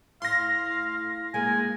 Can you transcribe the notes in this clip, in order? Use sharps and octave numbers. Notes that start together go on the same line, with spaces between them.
A2 F5 C6 A#6
G#3 A#3 G#5